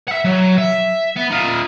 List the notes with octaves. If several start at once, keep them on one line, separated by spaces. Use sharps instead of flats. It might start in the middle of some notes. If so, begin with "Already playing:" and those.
E5 F#5
F#3
E5
B3
D#4 F4